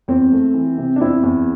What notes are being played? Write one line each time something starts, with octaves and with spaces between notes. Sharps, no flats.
E2 C4
A3
E3
C3
D4
E2 C4 E4
E2